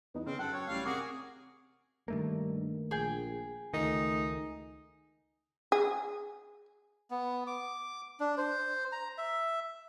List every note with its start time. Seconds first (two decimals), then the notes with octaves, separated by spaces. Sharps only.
0.14 E2 B3 D#4
0.27 C#3 C4 F6
0.39 F#2 A4 F#5 G5
0.54 C#5
0.68 A1 G3 F5
0.86 C3 F#4 G#4 A#4 D6
2.08 G2 D#3 A3 A#3
2.91 A#1 G#4 G5
3.74 C#2 D#3 A3 D#4
5.72 G#4
7.11 B3
7.47 D6
8.20 D4
8.37 C5
8.92 A#5
9.18 E5